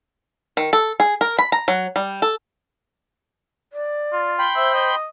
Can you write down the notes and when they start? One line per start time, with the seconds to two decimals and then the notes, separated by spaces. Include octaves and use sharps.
0.57 D#3
0.73 A4
1.00 G#4
1.21 A#4
1.38 B5
1.52 A#5
1.68 F#3
1.96 G3
2.22 A4
3.73 D5
4.13 F4
4.39 G5 B5 C6
4.56 C5 E5
4.74 D#5